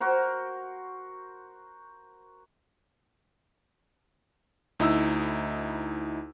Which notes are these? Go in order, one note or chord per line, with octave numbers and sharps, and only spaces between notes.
F#4 A#4 C5
D2 D#4 E4 A#5 E6